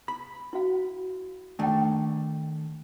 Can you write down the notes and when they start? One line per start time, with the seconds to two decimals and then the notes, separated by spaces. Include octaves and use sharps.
0.08 B5
0.53 E4 F#4 F5
1.59 D#3 A3 D4 G5 G#5